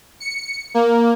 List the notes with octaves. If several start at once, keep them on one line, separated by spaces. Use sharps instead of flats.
C#7
A#3